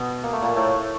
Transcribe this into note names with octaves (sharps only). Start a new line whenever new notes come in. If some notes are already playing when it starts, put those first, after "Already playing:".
Already playing: B2 B3
A#3
A3
A#2 A#3
A2 A3